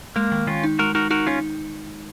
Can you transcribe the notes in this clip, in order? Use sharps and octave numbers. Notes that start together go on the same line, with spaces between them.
G#3 A#3
D#3
D#3 C#4 F4
D#4
G#3 F#4 A#4
D#4 F#4 A#4
D#4 F#4 A#4
C#4 D#4 F4